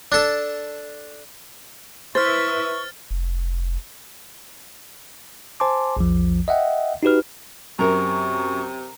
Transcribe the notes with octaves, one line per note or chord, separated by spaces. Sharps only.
D4 A4
E4 B4 C5 E5 C#6 F6 A6
F1
C5 G#5 A5 C6 D6
A#1 E2 F3
D#5 E5 F#5 G5
D#4 F#4 G4 B4 F6
F#2 C3 A#4 A#5 C#6